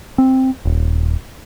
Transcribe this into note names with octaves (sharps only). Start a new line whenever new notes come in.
C4
D#1